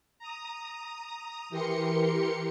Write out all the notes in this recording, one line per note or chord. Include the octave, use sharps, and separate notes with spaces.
A#5 D#6
E3 G4 A#4 C6 C#7